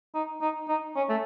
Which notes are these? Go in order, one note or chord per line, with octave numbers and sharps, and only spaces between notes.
D#4
D#4
D#4
C#4
A3